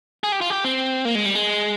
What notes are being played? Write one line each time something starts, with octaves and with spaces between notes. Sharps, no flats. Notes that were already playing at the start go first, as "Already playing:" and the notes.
G#4
G4
F4
G4
C4
A#3
G#3
G3
G#3